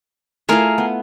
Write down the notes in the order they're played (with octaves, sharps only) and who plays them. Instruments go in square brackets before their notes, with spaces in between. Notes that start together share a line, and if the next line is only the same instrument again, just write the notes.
[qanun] A3 E4 F4 [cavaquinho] G#4 A#4
[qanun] B3